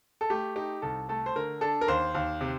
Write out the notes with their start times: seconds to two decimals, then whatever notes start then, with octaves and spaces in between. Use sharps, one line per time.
0.21 A4
0.30 A3 G4
0.56 D#4 G4
0.82 C2 A4
1.09 A3 A4
1.26 C5
1.36 D3 A#4
1.61 D4 A4
1.81 A#4
1.88 D#2 C5
2.15 D#2
2.41 C3